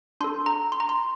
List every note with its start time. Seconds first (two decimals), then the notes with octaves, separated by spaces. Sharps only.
0.21 D4 A4 C6
0.46 A#5
0.72 C6
0.80 A#5
0.89 C6